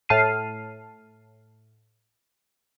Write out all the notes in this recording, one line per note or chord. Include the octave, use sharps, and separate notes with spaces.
A2 A5 F6 C7 D#7